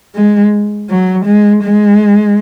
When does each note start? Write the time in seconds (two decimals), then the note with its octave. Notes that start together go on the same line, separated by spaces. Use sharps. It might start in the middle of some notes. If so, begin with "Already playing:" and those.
0.15 G#3
0.89 F#3
1.26 G#3
1.64 G#3